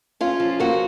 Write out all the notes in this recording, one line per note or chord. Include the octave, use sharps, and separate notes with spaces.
C#4 F4
F3
A#3 F#4